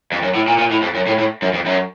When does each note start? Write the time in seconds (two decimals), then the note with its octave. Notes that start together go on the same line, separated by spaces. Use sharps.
0.12 F2
0.23 F#2
0.35 A2
0.48 A#2
0.59 A#2
0.71 A2
0.82 F2
0.95 F#2
1.07 A2
1.18 A2
1.42 F#2
1.53 F2
1.66 F#2